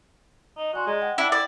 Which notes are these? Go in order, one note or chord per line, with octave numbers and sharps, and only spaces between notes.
D#4
F#4 D5 G#5 C6
G#3 G#4 D5 A#5
F#5 G5
D4 E4
E4 D5